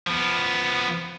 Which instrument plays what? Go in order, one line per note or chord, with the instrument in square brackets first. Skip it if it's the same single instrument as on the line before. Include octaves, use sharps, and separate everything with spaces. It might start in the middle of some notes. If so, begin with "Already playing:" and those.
[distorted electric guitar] F3 B3